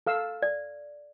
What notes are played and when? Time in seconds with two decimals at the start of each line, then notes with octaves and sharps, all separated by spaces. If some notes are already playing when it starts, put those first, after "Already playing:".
0.07 A4 F5 E6
0.42 D5